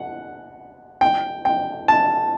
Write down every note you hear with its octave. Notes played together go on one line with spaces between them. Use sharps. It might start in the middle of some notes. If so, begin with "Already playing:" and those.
Already playing: F#5
G5
G5
A5